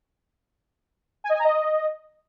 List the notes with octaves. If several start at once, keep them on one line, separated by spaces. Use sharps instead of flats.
G#5
D#5
G#5
A#5
D#5